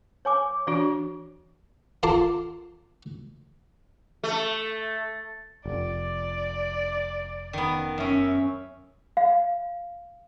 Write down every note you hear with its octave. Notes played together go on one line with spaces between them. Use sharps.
C#5 G#5 D6
E3 D4 F#4 D5
F4 A#4 A5 C6 D6
A3
F1 D5
D#3 B3
F#2 C#4 E5
F5